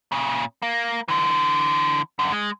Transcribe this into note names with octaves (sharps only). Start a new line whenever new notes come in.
A#2 C#3
A#3
D3 E3
F#2 D3
G#3